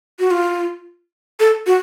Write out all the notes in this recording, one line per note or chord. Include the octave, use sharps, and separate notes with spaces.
F#4
F4
A4
F#4